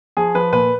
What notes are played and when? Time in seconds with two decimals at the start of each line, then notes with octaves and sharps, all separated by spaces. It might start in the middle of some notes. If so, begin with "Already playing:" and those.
0.17 F3 G#4
0.35 F3 B4
0.52 A#2 B4